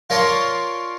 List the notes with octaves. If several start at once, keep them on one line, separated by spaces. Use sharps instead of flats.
F4 A#4 C#5 D5 A5 C6